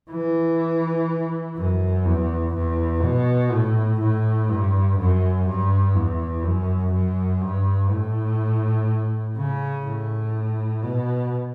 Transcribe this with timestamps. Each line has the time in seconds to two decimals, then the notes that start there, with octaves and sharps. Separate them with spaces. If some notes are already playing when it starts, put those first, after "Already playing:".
0.11 E3
1.57 F#2
2.05 E2
2.54 E2
3.03 B2
3.52 A2
4.00 A2
4.49 G2
4.98 F#2
5.47 G2
5.95 E2
6.44 F#2
6.92 F#2
7.41 G2
7.91 A2
9.37 C#3
9.85 A2
10.83 B2